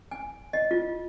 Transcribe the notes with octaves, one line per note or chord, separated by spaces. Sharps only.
G#5
D#5
F4